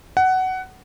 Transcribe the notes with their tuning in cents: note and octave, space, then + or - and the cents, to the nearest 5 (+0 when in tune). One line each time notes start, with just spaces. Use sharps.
F#5 +15